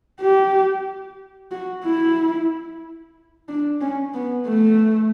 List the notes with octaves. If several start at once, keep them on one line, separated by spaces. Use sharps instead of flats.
G4
F#4
E4
D4
C#4
B3
A3